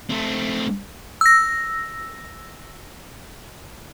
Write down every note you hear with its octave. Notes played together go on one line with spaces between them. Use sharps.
A3 C4
E6 A#6